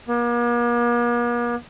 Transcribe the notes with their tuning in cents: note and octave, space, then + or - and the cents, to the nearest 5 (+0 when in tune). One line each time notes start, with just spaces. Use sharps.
A#3 +45